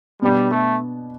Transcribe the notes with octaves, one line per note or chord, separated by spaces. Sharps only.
B2 G3 B3 D4
A3